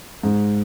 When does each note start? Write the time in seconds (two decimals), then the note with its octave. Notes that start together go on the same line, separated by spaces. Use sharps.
0.23 G#2